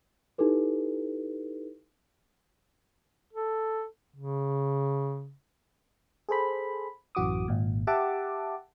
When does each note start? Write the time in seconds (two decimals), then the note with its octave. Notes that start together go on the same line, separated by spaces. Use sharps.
0.38 D#4 E4 G4 A4 B4
3.33 A4
4.16 C#3
6.29 G#4 A4 C5 B5
7.15 A1 F#2 E3 F#4 D6 D#6
7.48 G#1 A#2
7.87 G4 E5 F#5 A5 D6